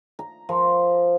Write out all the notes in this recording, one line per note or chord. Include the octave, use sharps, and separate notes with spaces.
A#5
F3 A#4